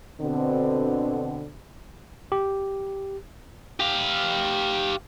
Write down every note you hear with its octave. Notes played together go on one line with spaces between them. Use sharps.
B2 D3 C4
G4
G4 F5